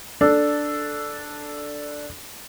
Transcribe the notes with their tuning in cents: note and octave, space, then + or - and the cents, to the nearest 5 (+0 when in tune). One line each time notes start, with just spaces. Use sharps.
D4 +0 A4 +0